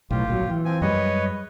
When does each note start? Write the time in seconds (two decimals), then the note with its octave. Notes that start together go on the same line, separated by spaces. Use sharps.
0.11 B1 A2 F4 G4
0.28 G#1 A#2 F#3
0.49 E3
0.65 F3 C4 G#5
0.81 F#2 G3 G#3 B4 C#5 D#5